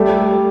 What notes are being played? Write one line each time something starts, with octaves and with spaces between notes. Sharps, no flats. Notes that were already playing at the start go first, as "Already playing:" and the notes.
Already playing: G3 A3